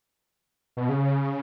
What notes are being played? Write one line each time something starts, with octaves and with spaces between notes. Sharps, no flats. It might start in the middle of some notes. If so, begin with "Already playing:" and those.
B2
C#3